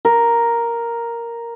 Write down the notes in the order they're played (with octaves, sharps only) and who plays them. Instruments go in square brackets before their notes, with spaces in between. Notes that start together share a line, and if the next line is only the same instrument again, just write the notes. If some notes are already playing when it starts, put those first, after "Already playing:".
[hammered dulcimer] A#4